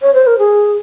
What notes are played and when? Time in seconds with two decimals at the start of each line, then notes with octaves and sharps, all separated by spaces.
0.02 C#5
0.14 C5
0.27 A#4
0.39 G#4